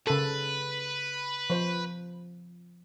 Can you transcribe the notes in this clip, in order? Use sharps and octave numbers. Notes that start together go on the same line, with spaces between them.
C#3 A4 B4
F3 C5